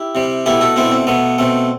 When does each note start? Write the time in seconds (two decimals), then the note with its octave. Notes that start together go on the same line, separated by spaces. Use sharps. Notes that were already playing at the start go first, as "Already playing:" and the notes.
Already playing: E4 G4
0.15 C3 G3
0.46 B2 A3 E4 G4
0.61 F#4 A4
0.76 B2 A3 C4 E4
0.86 D4
0.92 C4
1.07 B2 A3 B3
1.38 B2 A3 C4